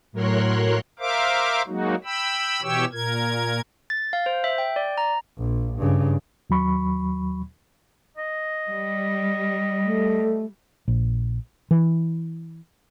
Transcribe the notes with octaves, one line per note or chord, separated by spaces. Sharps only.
A2 F#3 A#4 C#5 C6 F#6
A#4 C5 E5 F5 D6
F#3 G#3 A#3 D#4 F#4
G5 B5 E6
B2 E3 G4 C#5 G5 E6
A#2 A#4 G#6
A6
F5
C5
E5
G5
D5
A#5
A#1
G2 C#3
D#2 F#3 B5 C#6
D#5
G3
A3
A#1
E3